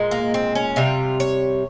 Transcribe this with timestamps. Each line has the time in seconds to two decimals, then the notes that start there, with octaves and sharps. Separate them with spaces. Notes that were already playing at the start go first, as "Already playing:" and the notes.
Already playing: A#2 G#3
0.11 A#3
0.34 C4
0.55 C#4
0.76 C3 G3 F4
1.20 C#5